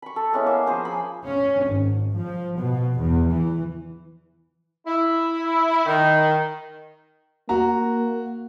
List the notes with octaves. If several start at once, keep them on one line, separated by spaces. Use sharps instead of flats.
B5 C#6
A4
G#3 B3 C#4 E4
A#3 B3 F5 E6
F3 G#4 C5 A#5
G#5 B5
C#4
G#1
F3
B2
E2
E3
E4
D#3
A#3 F#4 A#5